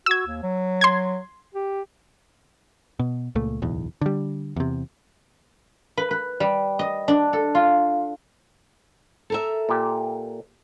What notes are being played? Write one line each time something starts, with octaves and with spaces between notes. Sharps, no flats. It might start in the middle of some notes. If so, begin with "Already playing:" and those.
F#4 E6 G#6
D#2
F#3
C6 G#6
G4
B2
C#2 A#2 A3
D1 B1 E2
D3 G3
E2 C3
B4
B4
G3
D#5
D4
A4
F4
A4 A#4 E5
A#2 G4